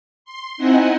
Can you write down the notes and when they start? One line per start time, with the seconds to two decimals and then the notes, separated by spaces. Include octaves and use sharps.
0.25 C6
0.58 C4 D#4 E4 D#5 F#5 G#5